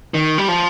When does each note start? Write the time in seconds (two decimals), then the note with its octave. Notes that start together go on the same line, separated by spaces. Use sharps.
0.14 D#3
0.38 G3
0.48 F3